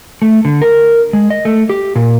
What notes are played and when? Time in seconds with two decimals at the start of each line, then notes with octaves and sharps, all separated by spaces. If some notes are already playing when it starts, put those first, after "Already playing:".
0.22 A3
0.45 D3
0.62 A#4
1.13 G#3
1.30 D#5
1.45 A3
1.70 G4
1.96 A#2